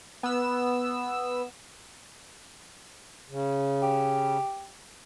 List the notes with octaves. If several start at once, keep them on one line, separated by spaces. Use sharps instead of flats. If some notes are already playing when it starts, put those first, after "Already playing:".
B3 E6
C#3
G4